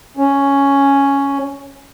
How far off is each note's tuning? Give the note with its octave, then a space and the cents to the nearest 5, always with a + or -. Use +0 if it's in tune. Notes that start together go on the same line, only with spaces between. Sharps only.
C#4 +0